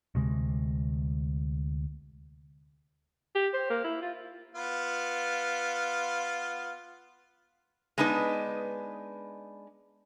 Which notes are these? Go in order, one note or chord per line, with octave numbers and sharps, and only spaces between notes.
D2 C3 G#3
G4
C5
A#3
E4
F4
B3 F4
G#3 B3 D4 D#4 B4